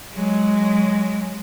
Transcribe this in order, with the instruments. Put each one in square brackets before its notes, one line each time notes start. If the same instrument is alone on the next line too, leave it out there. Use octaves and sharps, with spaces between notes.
[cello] F#3 G#3